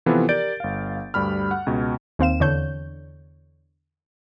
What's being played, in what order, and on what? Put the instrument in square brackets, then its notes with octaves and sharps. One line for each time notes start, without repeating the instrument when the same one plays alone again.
[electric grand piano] C3 E3 F3 B3 F4 A4
G4 A#4 D5 G6 A6 D7
G1 F5
D2 G2 G3 B5 F6
F#5
C#2 B2
[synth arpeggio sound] D#2 C4 F5 E7
E2 D3 C#5 G6